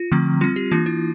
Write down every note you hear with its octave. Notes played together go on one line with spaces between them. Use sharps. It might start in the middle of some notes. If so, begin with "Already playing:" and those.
Already playing: F4
D3 F3 A3 C4
G3 C4 F4
G4
E3 A#3 D4 F4
E4